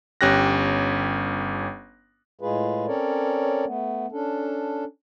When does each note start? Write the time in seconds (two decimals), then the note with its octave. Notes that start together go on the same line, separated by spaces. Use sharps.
0.21 G1 C#4 G4 F#6 A#6
2.41 A2 G#3 F4 G#4 B4
2.87 C4 C#4 A4 A#4 C#5 D5
3.66 A3 B3
4.12 C#4 D4 A4